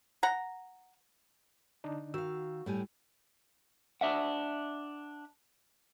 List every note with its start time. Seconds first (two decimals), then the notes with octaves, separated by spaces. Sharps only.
0.23 F#5 A#5
1.84 D3 D4 D#4
2.14 D#3 F#4 F5 E6
2.66 A2 G3 G#5
4.01 D4 E5 F#5